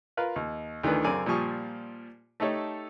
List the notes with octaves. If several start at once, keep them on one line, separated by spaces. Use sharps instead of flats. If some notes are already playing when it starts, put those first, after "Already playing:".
F4 A#4 B4 F5
D#2
D2 D#3 E3 D4 B4
F#2 C#3 C4 A#4 D5 G#5
A#2 F3 G3 G#5 C#6 D#6
A3 D#4 G4 A4 C#5